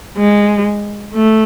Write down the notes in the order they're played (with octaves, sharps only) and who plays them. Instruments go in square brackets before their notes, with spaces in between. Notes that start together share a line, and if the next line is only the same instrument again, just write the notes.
[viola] G#3
A3